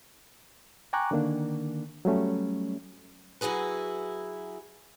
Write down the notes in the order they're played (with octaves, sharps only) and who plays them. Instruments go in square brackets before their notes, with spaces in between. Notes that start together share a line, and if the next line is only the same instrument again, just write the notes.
[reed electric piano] G5 G#5 A#5 C#6 D6 F#6
D3 D#3 A#3 D4
F#3 G3 A3 C#4
[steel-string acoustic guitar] F#3 E4 F#4 G#4 B4